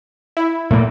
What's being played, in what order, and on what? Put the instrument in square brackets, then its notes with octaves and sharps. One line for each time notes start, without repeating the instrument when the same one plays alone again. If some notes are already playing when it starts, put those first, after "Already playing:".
[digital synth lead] E4
[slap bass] A#2 A3 A#3